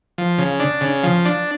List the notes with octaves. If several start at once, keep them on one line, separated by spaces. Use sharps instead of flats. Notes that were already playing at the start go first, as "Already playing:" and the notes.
F3
C#3
D4
C#3
F3
D4